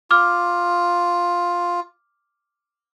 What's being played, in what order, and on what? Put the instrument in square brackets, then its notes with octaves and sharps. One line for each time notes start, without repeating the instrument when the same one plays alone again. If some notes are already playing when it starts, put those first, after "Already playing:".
[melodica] F4 [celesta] D6 F6